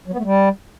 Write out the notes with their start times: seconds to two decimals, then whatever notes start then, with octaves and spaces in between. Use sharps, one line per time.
0.08 F#3
0.13 B3
0.19 A3
0.24 G3